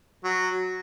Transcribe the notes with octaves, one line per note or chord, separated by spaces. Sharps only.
F#3